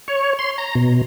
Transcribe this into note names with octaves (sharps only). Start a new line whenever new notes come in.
C#5
C6
A#5
B2